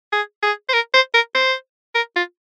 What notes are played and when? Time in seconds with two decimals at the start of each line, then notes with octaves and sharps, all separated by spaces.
0.12 G#4
0.43 G#4
0.69 C5
0.74 A#4
0.94 C5
1.14 A#4
1.35 C5
1.95 A#4
2.16 F4